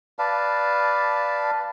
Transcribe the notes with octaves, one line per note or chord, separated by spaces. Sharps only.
B4 D5 F5 A5